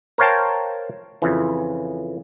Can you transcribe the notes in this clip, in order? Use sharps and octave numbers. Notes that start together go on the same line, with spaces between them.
A#4 C5 C#5 F5 G5 A5
F2 C#3 E3